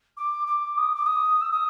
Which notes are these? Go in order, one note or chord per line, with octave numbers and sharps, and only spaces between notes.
D6
D6
D#6
D6
D#6
E6
D#6